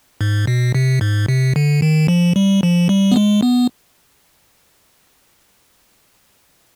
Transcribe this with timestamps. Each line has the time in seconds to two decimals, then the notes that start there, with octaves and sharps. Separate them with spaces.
0.21 G#2
0.47 B2
0.75 C3
1.01 G#2
1.28 C3
1.56 D3
1.82 D#3
2.08 F3
2.36 G3
2.63 F3
2.89 G3
3.12 B3
3.16 G#3
3.42 B3